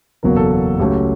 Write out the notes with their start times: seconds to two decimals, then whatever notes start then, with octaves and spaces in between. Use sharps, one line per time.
0.23 F#1 E2 B2 F#3 A#3 A#4
0.37 A4
0.51 F#4
0.79 C#2 C#3 F#3 A3 C#4 G4